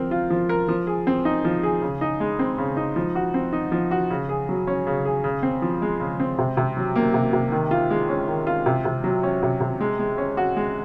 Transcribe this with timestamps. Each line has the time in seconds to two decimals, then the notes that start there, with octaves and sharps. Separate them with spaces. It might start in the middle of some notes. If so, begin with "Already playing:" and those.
Already playing: F3 C4 A#4
0.11 F4
0.30 F3
0.49 A#4
0.68 F3
0.87 G#4
1.07 C4
1.25 D#4
1.44 F3
1.63 G#4
1.82 C#3
2.01 D#4
2.20 G#3
2.39 C4
2.58 C#3
2.77 D#4
2.96 F3
3.15 F#4
3.34 C4
3.53 D#4
3.72 F3
3.91 F#4
4.10 C#3
4.29 G#4
4.49 F#3
4.67 C#4
4.87 C#3
5.05 G#4
5.24 C#3
5.43 C4
5.62 F3
5.82 G#3
6.00 C#3
6.19 C4
6.39 C3
6.57 C3
6.77 F#3
6.95 A#3
7.14 C3
7.33 C3
7.52 D#3
7.71 F4
7.90 G#3
8.09 C#4
8.28 D#3
8.47 F4
8.66 C3
8.85 C3
9.04 F#3
9.23 C#4
9.43 C3
9.61 C3
9.80 G#3
9.99 G#3
10.18 C#4
10.37 F#4
10.56 G#3